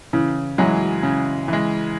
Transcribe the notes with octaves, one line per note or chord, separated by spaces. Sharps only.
C#3 E3
E3 F#3 G#3
C#3
E3 G#3